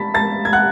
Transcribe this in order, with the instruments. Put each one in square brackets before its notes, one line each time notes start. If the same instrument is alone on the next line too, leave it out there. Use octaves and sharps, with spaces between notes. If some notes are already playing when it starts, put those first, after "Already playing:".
Already playing: [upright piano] A5 B5 A6 B6
A5 A6
G#6
F#5 F#6